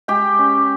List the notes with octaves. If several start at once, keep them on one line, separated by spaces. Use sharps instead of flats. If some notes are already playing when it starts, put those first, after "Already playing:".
G#3 G4 G5
C#4